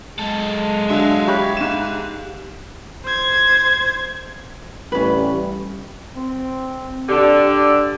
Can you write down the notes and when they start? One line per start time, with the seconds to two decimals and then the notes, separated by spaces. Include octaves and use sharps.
0.19 F#3 G#3 A4
0.90 D3 F#3 E5 F5
1.28 G4 C#5 B5 F#6
1.57 G#2 E7
3.05 C5 G#6
4.92 A1 G3 C#4 B4
6.16 C4
7.09 D3 G4